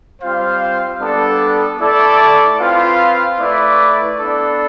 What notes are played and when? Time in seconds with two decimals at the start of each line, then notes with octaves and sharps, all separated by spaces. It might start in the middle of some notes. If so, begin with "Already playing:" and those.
0.21 G3 C4 F4 C5 F5
1.00 G3 B3 D4 A4
1.79 A3 E4 A4 D5
2.59 C4 F4 B4 F5
3.38 A3 E4 B4 D5
4.18 B3 D4 A4